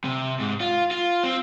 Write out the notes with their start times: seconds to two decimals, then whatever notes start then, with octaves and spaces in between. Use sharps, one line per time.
0.04 C3
0.40 G#2
0.61 F4
0.91 F4
1.23 C4